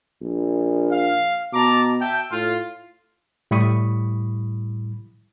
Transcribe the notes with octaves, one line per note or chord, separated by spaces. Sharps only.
A#1
F5
B2 A5 A#5 D6
E5 G5 A5
A2 F4
A2 G3 E4 B5 C#6 D#6